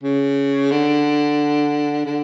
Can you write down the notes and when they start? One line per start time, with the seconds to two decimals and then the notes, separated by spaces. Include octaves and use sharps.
0.03 C#3
0.71 D3
2.06 D3